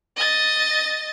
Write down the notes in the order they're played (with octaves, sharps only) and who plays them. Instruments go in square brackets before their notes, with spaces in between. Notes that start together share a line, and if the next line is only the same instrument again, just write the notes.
[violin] D#5 A6